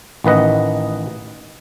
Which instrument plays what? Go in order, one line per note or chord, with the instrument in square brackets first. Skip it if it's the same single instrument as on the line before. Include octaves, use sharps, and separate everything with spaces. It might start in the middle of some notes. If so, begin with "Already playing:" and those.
[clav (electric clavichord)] A1 D#3 B4 D#5 F#5